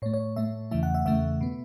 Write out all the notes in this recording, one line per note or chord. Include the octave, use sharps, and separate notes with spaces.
A2 A3 C#5
C#5
A2 A3 E5
E2 C#3 E3 A3 E5
F#5
E5
E2 C#3 E3 A3 E5
B2 B3